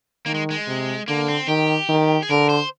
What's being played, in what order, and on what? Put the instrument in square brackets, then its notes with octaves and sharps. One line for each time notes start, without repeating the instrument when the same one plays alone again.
[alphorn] D#3 [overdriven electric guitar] A#3
[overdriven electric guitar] G#3
G#3
[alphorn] C3
[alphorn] D3 [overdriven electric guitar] A#3
[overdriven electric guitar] C4
[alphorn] D#3 [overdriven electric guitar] G4
[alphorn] D#3
[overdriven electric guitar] G#4
[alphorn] D3 [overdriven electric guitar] A#4
[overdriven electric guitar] C5